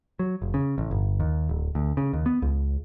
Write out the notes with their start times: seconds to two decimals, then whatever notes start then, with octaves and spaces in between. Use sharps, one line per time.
0.19 F#3
0.42 F1
0.54 C#3
0.78 A1
0.91 G1
1.20 D#2
1.49 D1
1.75 D2
1.97 C#3
2.13 D#2
2.26 B3
2.42 C#2